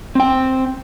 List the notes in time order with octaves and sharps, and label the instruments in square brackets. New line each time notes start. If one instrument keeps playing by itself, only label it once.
[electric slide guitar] C4 G5